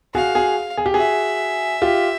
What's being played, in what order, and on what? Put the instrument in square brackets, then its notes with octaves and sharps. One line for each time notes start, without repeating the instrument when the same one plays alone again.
[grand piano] F#4 G#4 [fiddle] F5
[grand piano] F#4 G#4
G#4
G4
[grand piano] F#4 G#4 [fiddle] E5
[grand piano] F4 G4